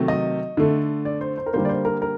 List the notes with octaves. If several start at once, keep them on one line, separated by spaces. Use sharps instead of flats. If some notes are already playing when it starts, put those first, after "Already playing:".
Already playing: C3 D#3 F#3 A3
D#5
D3 A3
D5
C5
C5
A#4
D3 G3 A#3 C5
D5
C5
A#4
A#4